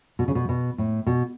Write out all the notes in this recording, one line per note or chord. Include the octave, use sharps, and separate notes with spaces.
B2
C#3
B2
B2
A2
B2